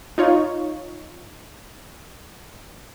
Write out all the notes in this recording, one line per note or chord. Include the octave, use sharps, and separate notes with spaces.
D#4 F4 C#5